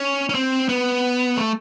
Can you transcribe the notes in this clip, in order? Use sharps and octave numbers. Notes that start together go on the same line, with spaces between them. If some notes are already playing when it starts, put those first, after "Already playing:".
Already playing: C#4
C#4
C4
B3
A3